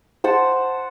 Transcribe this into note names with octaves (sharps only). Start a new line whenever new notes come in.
C5 F#5 A5